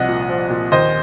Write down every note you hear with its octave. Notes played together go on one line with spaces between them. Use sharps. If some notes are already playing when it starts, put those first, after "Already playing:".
Already playing: C2 F3 D#5 F#5
A#2
F3
A#2
D#2 C5 D#5